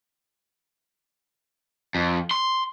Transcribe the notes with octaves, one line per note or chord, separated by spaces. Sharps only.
F2
C6